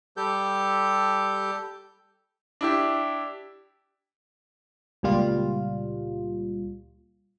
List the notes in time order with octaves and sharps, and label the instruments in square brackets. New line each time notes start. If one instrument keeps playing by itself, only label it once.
[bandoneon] G3 G4 A4 G6
[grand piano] D4 E4 G4
[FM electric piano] C#2 A#2 G3 F4